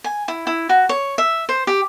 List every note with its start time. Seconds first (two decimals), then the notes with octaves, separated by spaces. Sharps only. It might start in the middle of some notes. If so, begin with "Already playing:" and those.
0.04 G#5
0.28 E4
0.47 E4
0.69 F#4
0.89 C#5
1.18 E5
1.49 C5
1.67 G4